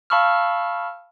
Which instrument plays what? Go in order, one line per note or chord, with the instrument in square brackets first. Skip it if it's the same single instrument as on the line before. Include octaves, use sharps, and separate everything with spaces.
[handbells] F5 A5 B5 C#6 E6 F6